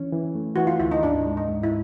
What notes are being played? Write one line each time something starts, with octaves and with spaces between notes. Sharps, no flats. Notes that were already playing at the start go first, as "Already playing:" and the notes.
Already playing: E3 C#4
E3
A3
E3 F#4
F4
D2 E4
D#4
G#2 D4
G#3
D#4
G#2
E4